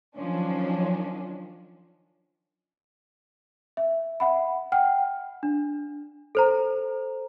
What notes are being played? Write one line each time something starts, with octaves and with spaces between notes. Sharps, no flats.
D#3 F3 F#3 C#4 D4
E5
E5 F#5 B5
F#5 G5 F6
D4
A4 C5 A#5